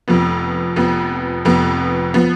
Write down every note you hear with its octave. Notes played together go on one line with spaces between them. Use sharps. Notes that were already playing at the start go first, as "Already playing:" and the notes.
F1 F2 F3 B3
F1 F2 F3 B3
F1 F2 F3 B3
F3 B3